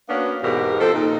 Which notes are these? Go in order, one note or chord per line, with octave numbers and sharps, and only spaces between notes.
A#3 B3 C#4 D4 F#4
E2 G#2 B2 G4 A#4
F3 C4 A4
A#2 D#3 D#4